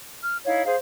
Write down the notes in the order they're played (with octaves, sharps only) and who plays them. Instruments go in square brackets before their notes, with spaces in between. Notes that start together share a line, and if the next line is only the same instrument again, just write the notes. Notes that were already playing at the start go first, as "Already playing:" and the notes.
[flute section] F6
D#4 E4 C#5 F5
G#4 C5 F5